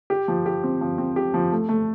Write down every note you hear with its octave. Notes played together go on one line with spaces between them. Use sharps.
G4
F3
G4
C4
F3
C4
G4
F3
A3
A3